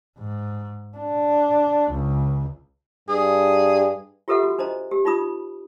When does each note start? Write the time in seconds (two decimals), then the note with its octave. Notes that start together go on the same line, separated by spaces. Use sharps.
0.18 G#2
0.98 D4
1.91 C#2
3.09 G2 G#4
4.28 F4 G4 A4 B4 E5 F#5
4.43 F#4
4.58 D4 C5 D#5 A#5
4.91 G4
5.05 D#4 F4 B5 D#6